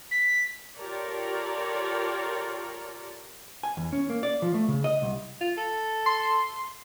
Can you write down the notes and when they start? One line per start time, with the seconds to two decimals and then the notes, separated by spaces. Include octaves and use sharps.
0.11 B6
0.78 F4 G4 A4 A#4 C#5 D5
3.63 G#5
3.77 E2
3.93 C#4
4.10 A#3
4.23 D5
4.42 F3
4.54 A3
4.68 C#3
4.84 D#5
5.02 C2
5.41 F4
5.57 A4
6.06 C6